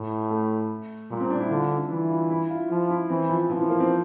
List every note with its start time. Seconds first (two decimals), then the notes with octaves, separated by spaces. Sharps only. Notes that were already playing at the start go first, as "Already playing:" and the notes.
Already playing: A2 A3
0.30 A3
1.11 A#2 G3
1.20 C4
1.30 D4
1.40 E4
1.50 D3 F4
1.77 D4
1.90 E3 E4
2.10 F4
2.30 E4
2.50 F4
2.70 F3 F4
2.90 E4
3.10 E3 C4
3.29 F3
3.49 E3 F3
3.60 E3
3.70 A#3
3.80 C4